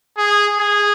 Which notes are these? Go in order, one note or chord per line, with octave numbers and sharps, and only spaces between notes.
G#4
G#4